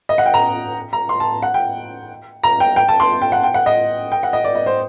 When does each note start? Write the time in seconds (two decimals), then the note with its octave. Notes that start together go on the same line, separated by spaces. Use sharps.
0.09 D#5
0.18 F#5
0.26 G5
0.34 A#5
0.93 A#5
1.09 C6
1.20 A5
1.42 F#5
1.54 G5
2.44 A#5
2.60 G5
2.76 G5
2.89 A5
3.00 C6
3.22 G5
3.32 F#5
3.44 G5
3.54 F#5
3.66 D#5
4.12 G5
4.23 F#5
4.33 D#5
4.44 D5
4.55 D#5
4.66 C5